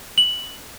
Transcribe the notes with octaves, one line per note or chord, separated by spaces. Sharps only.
F#7